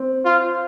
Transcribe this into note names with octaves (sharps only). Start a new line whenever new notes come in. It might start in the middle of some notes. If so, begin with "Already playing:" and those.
Already playing: C4
F4